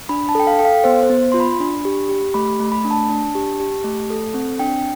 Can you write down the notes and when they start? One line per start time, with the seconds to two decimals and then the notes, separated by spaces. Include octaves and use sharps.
0.09 D4 B5
0.29 A5
0.35 A4 G5
0.47 F5
0.59 A4 G5
0.65 F5
0.84 B3 C5
1.03 C5
1.10 B3
1.32 F4 C6
1.40 B5
1.60 D4
1.85 G4
2.09 G4
2.34 A3 B5
2.60 A3
2.72 B5
2.85 D4
2.91 A5
3.09 D4
3.35 G4
3.60 G4
3.84 A3
4.10 A4
4.34 C4
4.59 D4 G5